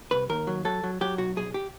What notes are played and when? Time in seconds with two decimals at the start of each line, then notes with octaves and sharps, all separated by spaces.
0.11 C2 B4
0.29 D#2 A#4
0.47 F#3
0.65 F#3 A4
0.84 F#3
1.01 F#3 G4
1.18 B1 F#4
1.36 B1 G#4
1.54 G4